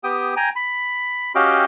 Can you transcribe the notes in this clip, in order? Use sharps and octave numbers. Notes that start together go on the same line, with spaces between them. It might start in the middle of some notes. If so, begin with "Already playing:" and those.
B3 G4 G5 D#6
G5 G#5 A#5
B5
C#4 F#4 G4 D#5 F5 G5